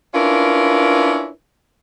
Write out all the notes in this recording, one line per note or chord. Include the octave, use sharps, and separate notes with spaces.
C#4 D4 E4 F4 A#4 B4